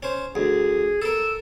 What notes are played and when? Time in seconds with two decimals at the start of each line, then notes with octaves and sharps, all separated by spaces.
0.03 C#4 C5
0.35 D2 G#4
1.02 A4 A#4 E6